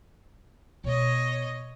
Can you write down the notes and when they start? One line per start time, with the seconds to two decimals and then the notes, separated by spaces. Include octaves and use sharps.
0.84 B2 C#5 D#5